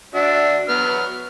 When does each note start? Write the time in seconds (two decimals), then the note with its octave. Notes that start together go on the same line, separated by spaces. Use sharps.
0.15 D4 F#4 E5
0.69 F#3 B3 F6